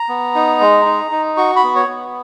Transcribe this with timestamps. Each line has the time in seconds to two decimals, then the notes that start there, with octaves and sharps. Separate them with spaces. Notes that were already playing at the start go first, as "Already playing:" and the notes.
Already playing: A#5
0.09 B3
0.35 D#4
0.60 G#3
0.85 D#4
1.11 D#4
1.37 F#4 C#6
1.56 B5
1.64 B3
1.76 C#5
1.88 B3